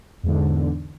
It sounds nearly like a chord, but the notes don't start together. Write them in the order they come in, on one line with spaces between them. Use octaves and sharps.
E2 G#2 D3